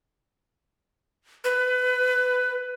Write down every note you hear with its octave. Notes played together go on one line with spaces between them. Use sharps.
B4